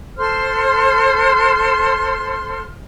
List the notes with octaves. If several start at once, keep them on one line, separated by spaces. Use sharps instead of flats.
A4 C5 C6 F6